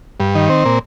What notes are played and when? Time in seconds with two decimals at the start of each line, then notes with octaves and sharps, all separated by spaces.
0.20 G2
0.35 D#3
0.49 C4
0.65 A#2